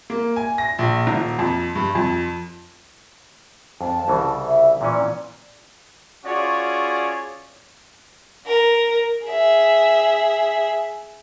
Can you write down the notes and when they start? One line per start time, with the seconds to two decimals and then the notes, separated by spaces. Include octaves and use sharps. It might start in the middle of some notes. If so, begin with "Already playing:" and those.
0.10 A#3
0.36 G#5
0.58 A#6
0.79 A#1
1.07 D#1
1.39 F2
1.75 G2
1.95 F2
3.81 F2 A5
4.08 C2 C#3 E3
4.45 E5
4.81 A#2 E3 C#4 D5
6.25 C#4 F4 F#4 G#4 C#5 D5
8.47 A#4
9.27 G#4 E5